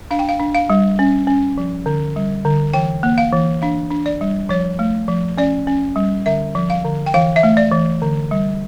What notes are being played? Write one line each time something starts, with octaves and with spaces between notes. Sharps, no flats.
D4 F5
G5
F5
D4
F5
G3
C#4
C#4
F3
D3
G3
D3
E3 G5
A#3
F5
E3
D4 F5
D4
D5
G3
F3 C#5
A3
F3
C#4 D5
C#4
G3
D3 E5
F3
F5
D3
G5
E3 F5
E5
A3
D5
E3
D3
G3